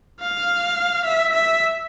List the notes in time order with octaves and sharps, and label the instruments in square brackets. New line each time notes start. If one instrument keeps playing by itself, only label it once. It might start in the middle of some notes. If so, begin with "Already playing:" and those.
[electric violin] F5
E5
E5